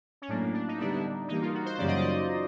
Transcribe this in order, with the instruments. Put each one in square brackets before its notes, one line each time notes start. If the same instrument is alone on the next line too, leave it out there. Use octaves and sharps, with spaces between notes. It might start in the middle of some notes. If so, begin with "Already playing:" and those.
[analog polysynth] C#4
[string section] A2 F#3 A#3 [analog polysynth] D4
[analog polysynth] D4
D#4
[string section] D3 G3 B3 E4 [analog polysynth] D4
[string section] E3 G3 A#3 [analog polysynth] D#4
[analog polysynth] F4
F#4
C5
[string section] F#2 C#3 E3 G3 A#3 [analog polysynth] D5
[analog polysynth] D#5
D5